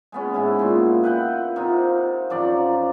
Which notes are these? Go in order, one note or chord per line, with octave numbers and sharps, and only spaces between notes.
G#3 B3 C#4
G#2 E4
A#2 C6
B4 F#5 G5
C3 D#4 F4
F#2 F3 D5 A#5